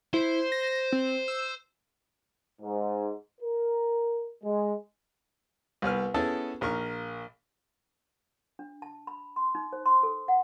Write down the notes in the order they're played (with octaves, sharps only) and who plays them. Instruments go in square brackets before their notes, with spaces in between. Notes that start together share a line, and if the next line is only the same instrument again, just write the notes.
[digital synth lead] E4 [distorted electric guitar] C5
[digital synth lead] A#6
C4
E6
[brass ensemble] G#2
A#4
G#3
[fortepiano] C2 B3 B4 F6
B3 C#4 E4 G#4 A4 A5
A#1 A#4 C#6
[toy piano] D4
A5
B5
C6
D#4
C5
C6
A4
F#5